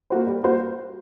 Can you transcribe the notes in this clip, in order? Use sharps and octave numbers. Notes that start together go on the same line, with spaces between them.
A#3 F#4 C5
G3
A#3 F#4 C5